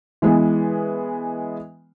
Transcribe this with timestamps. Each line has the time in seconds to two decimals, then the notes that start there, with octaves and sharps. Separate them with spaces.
0.22 E3 G#3 B3